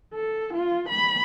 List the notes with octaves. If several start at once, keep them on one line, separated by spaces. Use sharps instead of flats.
A4
F4
B5